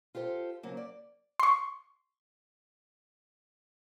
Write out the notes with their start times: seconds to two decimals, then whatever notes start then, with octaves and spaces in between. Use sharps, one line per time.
0.15 F4 G4 A4 C5
0.63 C#3 F#3 A#3 C4
0.77 D5
1.40 C6 C#6